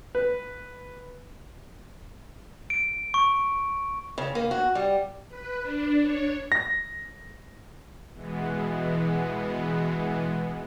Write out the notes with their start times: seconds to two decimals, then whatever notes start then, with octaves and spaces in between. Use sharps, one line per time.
0.15 B4
2.70 D7
3.14 C#6
4.18 C#3
4.35 A#3
4.51 F#4
4.75 G3
5.29 B4
5.61 D4
6.01 C#5
6.52 A#6
8.13 B2 E3 G#3 B3